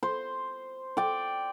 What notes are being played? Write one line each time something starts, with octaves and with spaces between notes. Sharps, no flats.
C5
D5 G5